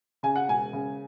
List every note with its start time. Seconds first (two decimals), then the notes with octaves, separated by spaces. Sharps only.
0.23 C#3 G#5
0.36 F#5
0.49 E1 G#5
0.73 C#3